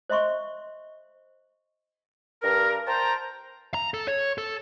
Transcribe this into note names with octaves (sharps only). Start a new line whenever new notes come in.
C5 D#5 E5 C6 C#6
G2 A#4
A#4 C5 G5 A5 A#5
A#5
A4
C#5
A4